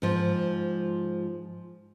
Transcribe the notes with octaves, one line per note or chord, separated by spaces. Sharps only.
G#2 F3